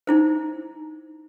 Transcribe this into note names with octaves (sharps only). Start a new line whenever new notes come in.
D#4 E4 C5